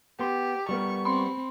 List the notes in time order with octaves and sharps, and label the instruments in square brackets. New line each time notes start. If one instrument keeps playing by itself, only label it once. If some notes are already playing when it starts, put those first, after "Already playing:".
[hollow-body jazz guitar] B3 C6 [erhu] G4
[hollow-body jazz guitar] G3 B3 A#4 [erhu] C#6
[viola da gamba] C4 [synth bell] B5 C6